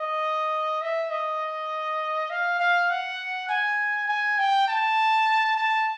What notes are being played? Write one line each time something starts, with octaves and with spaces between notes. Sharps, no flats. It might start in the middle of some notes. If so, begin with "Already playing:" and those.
Already playing: D#5
E5
D#5
F5
F5
F#5
G#5
G#5
G5
A5
A5